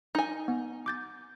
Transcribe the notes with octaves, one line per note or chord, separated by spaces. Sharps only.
D#4 G#5
B3
D6 G6 A6